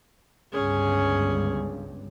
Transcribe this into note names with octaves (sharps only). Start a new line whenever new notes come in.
G1 C#2 G2 C#4 G#4